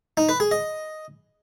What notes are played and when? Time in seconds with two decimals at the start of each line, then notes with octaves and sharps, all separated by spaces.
0.17 D#4
0.29 B4
0.40 G#4
0.51 D#5